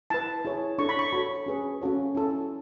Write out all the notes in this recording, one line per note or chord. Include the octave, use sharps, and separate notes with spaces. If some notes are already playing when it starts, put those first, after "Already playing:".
E4 B4 A5
E4 G#4 C#5
D4 A4 C#5 C#6
B5
C#6
F#4 A4 C#5 B5
C#4 G#4 B4
C#4 F#4 A4 C#5
C#4 E4 A4